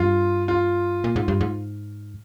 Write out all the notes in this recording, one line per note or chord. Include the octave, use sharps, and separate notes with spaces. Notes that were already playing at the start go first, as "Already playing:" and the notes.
Already playing: G2 F4
F4
A#2
G#2
G2
G#2